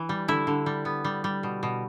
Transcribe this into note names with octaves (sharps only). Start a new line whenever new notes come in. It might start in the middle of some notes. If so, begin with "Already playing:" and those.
Already playing: E3
G3
D3 E4
D3
G3
B3
G3
G3
B2
B2